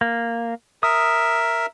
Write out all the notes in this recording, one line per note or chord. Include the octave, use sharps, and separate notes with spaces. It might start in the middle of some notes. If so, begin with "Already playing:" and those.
A#3
A#4 E5 D#6